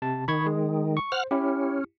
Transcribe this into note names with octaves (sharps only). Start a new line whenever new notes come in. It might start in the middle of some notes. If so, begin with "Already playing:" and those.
C3 A5
D#3 B5 C#6 G#6
G#3
C#6
C5 F#5 F6
C#4 E4 G4